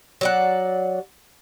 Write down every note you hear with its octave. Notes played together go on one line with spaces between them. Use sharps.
F#3 D5 F#5